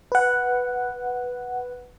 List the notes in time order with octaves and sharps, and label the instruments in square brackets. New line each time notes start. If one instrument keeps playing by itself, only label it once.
[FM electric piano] B4 F#5